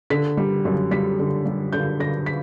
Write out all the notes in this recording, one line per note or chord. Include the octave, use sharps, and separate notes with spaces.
D3 B6
G3
F#2
G3 B6
D3
G3
D3 G6
D3 A#6
B6